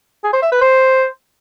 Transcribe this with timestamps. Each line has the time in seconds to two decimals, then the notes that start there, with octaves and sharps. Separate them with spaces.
0.24 G#4
0.33 C5
0.43 E5
0.52 B4
0.61 C5